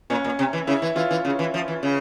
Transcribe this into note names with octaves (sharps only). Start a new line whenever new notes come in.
A#2 C#4
A#2
C3
E3
C#3 E4
E3
E3 F4
E3
C#3
E3
F3
E3
C#3